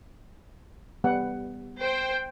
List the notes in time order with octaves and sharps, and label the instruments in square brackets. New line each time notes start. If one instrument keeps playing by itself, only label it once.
[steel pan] G3 B3 F#5
[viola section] C5 G5